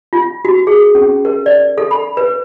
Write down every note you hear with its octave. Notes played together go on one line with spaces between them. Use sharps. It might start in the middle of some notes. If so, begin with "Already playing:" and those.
F4
F#4
G#4
C#4
A#4
D5
A4
B5
B4